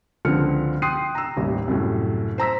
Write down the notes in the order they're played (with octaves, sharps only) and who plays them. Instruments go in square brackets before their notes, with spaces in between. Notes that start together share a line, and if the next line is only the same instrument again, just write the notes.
[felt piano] C#2 D3 F3 C4 F6 C#7
G5 C6 D#6 F#6 C7 D#7
A#5 E6
A1 D#2 G3
C2 F#2 A2
C5 A#5 E6 B6